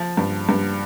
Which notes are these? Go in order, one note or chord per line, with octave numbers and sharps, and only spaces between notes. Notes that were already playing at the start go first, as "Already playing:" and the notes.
Already playing: F3
G2
G2